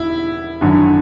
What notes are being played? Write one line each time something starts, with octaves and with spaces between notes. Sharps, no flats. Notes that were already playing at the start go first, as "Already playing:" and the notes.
Already playing: E1 E4
G#1 F#2 D3